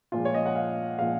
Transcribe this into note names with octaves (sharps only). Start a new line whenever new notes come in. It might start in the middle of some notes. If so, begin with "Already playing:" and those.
A#2 F3 G#3 F4
C#5
D#5
F#5
F5
A#2 F3 G#3 F5